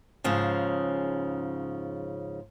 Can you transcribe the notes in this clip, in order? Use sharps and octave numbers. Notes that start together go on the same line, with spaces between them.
G#2 C#3 F3